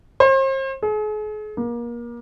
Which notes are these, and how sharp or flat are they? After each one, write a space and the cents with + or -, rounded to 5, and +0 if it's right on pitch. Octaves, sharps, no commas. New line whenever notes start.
C5 +40
G#4 +40
A#3 +30